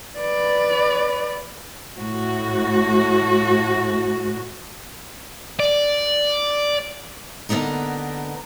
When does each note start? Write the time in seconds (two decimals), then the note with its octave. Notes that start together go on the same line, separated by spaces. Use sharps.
0.18 B4 D5
1.98 A2 F#4
5.59 D5
7.49 D3 A#3 B3 D#4 A#4